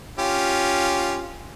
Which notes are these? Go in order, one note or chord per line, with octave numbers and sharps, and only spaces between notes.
C#4 F4 G4